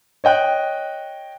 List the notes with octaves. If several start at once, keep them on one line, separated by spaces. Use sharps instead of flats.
C#5 D#5 G5 F#6